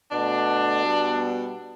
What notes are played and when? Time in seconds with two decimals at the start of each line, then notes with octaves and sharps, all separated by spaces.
0.12 B2 A3 D4
0.83 B2 G3 B3